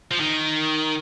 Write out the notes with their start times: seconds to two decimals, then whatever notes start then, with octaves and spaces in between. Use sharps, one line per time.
0.11 F3
0.20 D#3